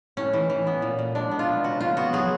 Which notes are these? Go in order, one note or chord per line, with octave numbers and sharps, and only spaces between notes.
A2 C#4
E3
E3
B3
A#2
A#2
G#3 D4
B3
F4
B2
C#3 F#4
C#3 F4
B3 F#4
F#3 G#4